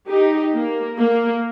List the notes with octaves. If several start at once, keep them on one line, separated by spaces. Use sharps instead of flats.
D#4 G4
A#3
A#3